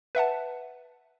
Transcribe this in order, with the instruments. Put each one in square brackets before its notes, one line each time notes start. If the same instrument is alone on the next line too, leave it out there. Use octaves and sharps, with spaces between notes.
[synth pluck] B4 E5 F#5 A5